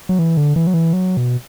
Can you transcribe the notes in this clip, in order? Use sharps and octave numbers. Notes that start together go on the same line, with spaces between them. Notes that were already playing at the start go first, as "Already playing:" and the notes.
F#3
E3
D3
E3
F#3
E3
F#3
B2